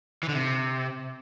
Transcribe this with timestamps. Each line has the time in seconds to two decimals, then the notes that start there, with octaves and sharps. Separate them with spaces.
0.23 E3
0.29 D3
0.35 C3